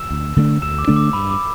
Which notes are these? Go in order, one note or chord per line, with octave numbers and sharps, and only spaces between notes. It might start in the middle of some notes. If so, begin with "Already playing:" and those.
Already playing: E6 E7
D2
D3 A3 D4
D2 E6 E7
D6
D3 A3 D4
D6
G2 B5
D6